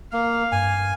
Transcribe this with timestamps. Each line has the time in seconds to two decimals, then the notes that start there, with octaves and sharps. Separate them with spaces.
0.13 A#3 F5
0.52 G2 G#5